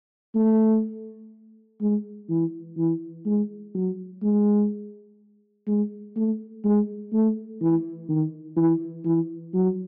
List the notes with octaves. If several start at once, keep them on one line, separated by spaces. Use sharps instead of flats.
A3
G#3
E3
E3
G#3
F#3
G#3
G#3
A3
G#3
A3
E3
D#3
E3
E3
F#3